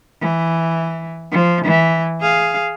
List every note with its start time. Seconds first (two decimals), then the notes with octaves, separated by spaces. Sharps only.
0.21 E3
1.31 F3
1.65 E3
2.21 G#4 F5